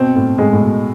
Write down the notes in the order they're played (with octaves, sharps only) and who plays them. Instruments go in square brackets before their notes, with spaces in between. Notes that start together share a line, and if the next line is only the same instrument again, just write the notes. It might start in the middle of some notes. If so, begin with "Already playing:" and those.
Already playing: [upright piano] B2 [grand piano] C4
[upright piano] A2
[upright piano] A2 [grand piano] G#3
[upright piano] A2
B2